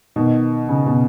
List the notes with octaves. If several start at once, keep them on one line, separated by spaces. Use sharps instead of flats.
B2 D#3
C#3
B2